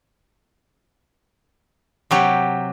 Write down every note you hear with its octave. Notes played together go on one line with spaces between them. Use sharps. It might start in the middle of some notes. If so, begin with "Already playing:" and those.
C3 F#3 G4